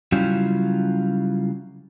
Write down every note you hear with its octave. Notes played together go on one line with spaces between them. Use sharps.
C#3 F#3 G3 C#4 E4 F4